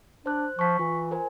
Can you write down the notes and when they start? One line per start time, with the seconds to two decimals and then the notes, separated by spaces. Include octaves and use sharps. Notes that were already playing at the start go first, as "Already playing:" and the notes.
0.26 D4 C5 F#6
0.59 F3 C#6 B6
0.79 E3 F4
1.11 A#4 C5 G#5